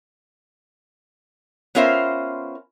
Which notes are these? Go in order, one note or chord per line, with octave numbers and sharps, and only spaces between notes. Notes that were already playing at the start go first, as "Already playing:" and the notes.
B3 C#4 F4 A#4 C5 E5